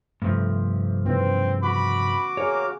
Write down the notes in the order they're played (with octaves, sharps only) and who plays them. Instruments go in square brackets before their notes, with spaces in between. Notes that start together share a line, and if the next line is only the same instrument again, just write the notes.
[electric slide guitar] G2 C3 F3 [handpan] A3
[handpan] C#3 E3 B3 [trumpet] C4
[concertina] F#4 D6 [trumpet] B5
[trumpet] A#3 [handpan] G#4 [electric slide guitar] C#5